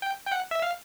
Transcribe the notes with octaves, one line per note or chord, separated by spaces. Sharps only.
G5
G5
F#5
E5
F5